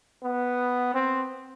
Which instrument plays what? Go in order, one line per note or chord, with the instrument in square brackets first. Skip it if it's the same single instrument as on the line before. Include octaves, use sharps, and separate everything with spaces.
[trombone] B3
C4